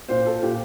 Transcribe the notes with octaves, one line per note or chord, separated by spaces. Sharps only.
A#2 C5
A4
A#2 G4